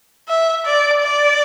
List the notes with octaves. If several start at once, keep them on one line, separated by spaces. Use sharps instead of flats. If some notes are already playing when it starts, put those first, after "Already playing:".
E5
D5
D5